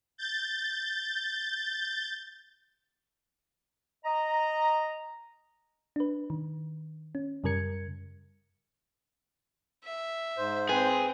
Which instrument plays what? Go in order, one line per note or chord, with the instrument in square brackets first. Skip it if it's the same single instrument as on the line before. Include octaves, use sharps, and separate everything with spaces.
[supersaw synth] G6 A6
[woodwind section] D#5 A#5
[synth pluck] D4 B4
D#3
C#4
F#2 C#3 G3 A#4 G#6 C#7
[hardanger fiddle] E5
[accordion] G#2 C5
[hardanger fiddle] C4 [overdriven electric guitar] G#4 [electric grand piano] B4 G5